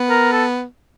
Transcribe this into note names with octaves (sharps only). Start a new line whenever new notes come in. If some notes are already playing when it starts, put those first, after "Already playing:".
Already playing: B3
A#4
A4